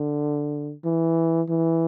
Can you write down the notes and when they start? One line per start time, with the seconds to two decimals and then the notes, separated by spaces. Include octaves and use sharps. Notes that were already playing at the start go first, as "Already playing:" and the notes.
Already playing: D3
0.85 E3
1.49 E3